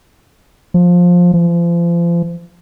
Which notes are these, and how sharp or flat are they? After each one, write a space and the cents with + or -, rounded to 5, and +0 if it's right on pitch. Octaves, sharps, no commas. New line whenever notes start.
F3 +15
F3 -35